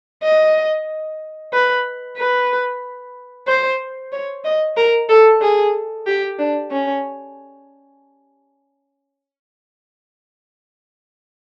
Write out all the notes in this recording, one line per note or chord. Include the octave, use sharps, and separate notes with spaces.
D#5
B4
B4
C5
C#5
D#5
A#4
A4
G#4
G4
D4
C#4